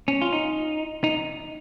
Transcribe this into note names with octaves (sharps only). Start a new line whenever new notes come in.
C#4
F4
D#4
D#4